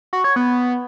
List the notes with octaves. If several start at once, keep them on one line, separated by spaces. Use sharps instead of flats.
F#4
C#5
B3